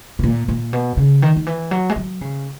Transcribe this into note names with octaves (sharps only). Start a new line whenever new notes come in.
B2
A#2
A#2
B2
C#3
D#3
D#3
E3
F#3
G#3
F#3
C#3